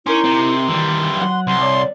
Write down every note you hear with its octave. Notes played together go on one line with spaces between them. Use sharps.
C#4 D#4 E4 A#4 C6 D6
C3
D#3 E3 G3
F#3 B3 F#5
C2 C6
C#5 D5